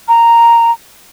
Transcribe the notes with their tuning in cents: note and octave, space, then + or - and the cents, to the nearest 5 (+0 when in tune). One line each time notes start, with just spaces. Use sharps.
A#5 -5